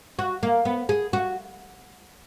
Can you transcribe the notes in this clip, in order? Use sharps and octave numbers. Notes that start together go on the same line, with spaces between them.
F#4
A#3
B3
G#4
F#4